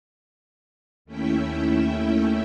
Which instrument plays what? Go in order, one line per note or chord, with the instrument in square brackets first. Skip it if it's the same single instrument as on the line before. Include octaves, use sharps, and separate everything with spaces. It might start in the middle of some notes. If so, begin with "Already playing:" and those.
[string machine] D#2 A3 C#4 E4 E5 G5